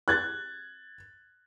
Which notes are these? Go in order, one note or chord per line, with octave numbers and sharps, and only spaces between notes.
F#6 G#6 A6